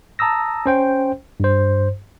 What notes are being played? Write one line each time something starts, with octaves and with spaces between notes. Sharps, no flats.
A5 A#5 D#6 E6 A#6
C#4 C5 G5
G2 C5